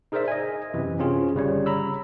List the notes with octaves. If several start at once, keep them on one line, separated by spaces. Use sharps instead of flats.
D#4 G#4 A#4 C5 D5 E5
D#5 G#5
F#2 C3 E3
C4 C#4 F4 G#4
G1 C#3 G3 C#5
A#5 B5 E6